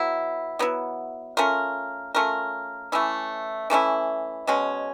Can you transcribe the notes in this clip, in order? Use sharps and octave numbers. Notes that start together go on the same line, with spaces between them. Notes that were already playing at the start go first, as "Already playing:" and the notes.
Already playing: F#3 B3 E4
F#3 B3 E4
A3 C#4 F4 A#4
A3 C#4 F4 A#4
E3 A3 C#4 E4
E3 A3 C#4 E4
B2 G#3 C#4